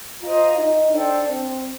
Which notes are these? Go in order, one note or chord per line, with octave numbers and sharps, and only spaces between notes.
F4 C5 D#5 A#5
D#4
D4 A4 C5 G5
C4